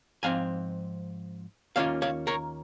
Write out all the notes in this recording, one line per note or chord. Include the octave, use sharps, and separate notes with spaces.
G#2 F3 C4 F5 G#5
D#2 D#3 A#3 C#4 F4 C#5 F5
C#5 F5
A#4 C#5